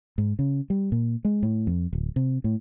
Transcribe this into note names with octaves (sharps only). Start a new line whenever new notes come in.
G#2
C#3
G3
A#2
G#3
A2
F2
D1
C3
A2